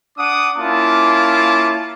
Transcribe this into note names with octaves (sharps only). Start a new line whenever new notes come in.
D4 F#5 D6 D#6
A#3 C#4 E4 F4 A5 D6